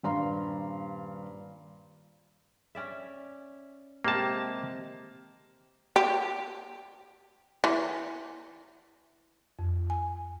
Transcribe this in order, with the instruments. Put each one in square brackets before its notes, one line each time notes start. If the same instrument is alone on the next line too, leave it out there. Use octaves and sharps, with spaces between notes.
[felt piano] D#1 G2 F5 A#5 C6
[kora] C#4 D5 E5
[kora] C3 G#3 G4 [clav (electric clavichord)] A#3 A5
[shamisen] G4
E3
[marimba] F2
G#5